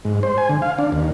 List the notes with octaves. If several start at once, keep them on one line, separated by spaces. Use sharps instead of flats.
G#2
C5
G#5
D3
F5
D4
D#2